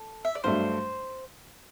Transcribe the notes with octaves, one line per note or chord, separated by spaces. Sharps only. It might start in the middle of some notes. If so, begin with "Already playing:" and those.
Already playing: A4
E5
D5
G2 F#3 A3 D4 C5